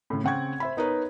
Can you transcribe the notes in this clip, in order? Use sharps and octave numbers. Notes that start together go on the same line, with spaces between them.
A2 C#3
C#3 C4 F#5 G5 C#6 G#6
C5 E5 B5
B3 D#4 A#4 B4 C#5